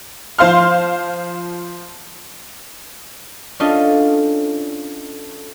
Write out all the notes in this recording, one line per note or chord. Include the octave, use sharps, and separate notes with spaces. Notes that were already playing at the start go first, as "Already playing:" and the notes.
F3 C5 F5 C6 F6
C#4 D4 F4 A4 D#5